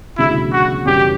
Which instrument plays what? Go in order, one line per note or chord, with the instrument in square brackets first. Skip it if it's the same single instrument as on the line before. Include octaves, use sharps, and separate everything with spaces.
[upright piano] E1 D2 C#3 F#3 [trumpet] E4
[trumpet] F#4
[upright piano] F#2 C#3 E3 G3 [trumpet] G4